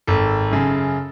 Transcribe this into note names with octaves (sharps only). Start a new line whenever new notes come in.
G#1 A4
F#2 C#3